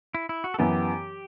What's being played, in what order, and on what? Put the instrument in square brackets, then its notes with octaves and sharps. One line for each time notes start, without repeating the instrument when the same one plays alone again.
[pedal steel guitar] E4
E4
F#4
A4
[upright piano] F#2 E3 B3 [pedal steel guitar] G4